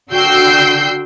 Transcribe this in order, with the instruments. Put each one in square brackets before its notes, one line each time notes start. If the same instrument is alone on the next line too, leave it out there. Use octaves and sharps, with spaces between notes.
[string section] D3 F#4 G5 E6 G6 C7